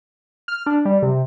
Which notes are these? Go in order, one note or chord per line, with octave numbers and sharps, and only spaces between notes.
F6
D4
G3
C3